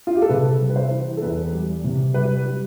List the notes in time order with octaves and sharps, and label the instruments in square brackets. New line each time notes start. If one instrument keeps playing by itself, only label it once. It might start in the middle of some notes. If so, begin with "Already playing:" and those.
[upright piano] F4
G4
A4
C3 B4
G3
B4
C5
E3
A4
E2 B4
G3
C3
G3 B4
G3